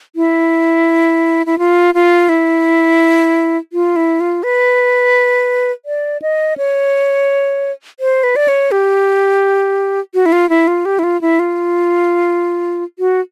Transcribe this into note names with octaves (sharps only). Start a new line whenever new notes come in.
E4
E4
F4
F4
E4
F4
E4
F4
B4
D5
D#5
C#5
C5
B4
D5
C#5
G4
F#4
E4
F4
E4
F4
G4
E4
F4
E4
F4
F#4